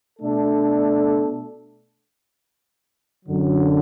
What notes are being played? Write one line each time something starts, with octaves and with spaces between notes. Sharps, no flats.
B2 A3 D4 A4
F#2 D3 F#3